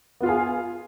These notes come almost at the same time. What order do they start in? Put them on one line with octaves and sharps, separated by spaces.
B3 F4 F5 G#4